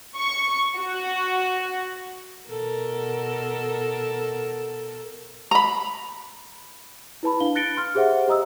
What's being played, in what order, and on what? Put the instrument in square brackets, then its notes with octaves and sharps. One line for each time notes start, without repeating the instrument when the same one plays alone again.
[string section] C#6
F#4
[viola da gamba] B2 A4 A#4
[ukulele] A#5 B5
[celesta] E4 B4 A5 B5
D4 F5 G7
F#6 A6 A#6 C#7 D7 G7
C6 F6
G4 G#4 C5 E5 F#5
G4 D#5 A#5 D#6 E6